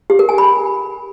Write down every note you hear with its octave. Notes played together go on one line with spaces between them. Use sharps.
G4
A#4
G#5
B5